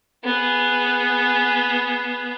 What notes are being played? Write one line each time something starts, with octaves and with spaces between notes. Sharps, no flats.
B3 G#4